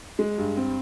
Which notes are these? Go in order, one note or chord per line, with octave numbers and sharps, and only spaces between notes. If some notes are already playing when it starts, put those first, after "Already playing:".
G#3
G2
C4